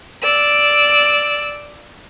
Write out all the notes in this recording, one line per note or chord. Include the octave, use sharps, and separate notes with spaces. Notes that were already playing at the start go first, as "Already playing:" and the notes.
D5 E6